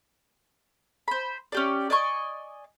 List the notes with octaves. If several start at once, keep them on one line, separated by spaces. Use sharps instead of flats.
C5 B5
C#4 G4 D5
D5 D#5 G#5 C#6